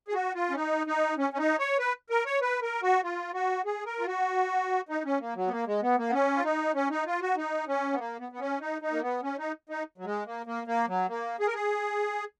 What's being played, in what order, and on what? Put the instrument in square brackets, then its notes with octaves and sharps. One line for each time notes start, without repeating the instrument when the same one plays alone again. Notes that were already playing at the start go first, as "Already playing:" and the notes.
[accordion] G#4
F#4
F4
C#4
D#4
D#4
C#4
C#4
D#4
C#5
B4
A#4
C#5
B4
A#4
F#4
F4
F#4
G#4
A#4
F4
F#4
D#4
C#4
A#3
F#3
B3
A#3
G#3
B3
A#3
B3
C#4
F4
D#4
C#4
D#4
F4
F#4
D#4
C#4
B3
A#3
B3
B3
C#4
D#4
D#4
A#3
B3
C#4
D#4
D#4
F#3
G#3
A#3
A#3
A#3
F#3
A#3
G#4
A#4
G#4